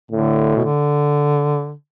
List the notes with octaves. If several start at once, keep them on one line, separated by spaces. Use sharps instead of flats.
A2 D3
B2
D3